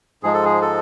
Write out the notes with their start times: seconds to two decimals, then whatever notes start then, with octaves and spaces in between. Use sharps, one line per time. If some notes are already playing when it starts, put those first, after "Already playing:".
0.23 G#2 F3 G#3 G#4
0.34 A4
0.44 G#4
0.62 A4